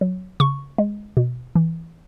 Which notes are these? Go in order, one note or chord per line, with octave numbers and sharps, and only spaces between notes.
F#3
C#3 C#6
G#3
B2
E3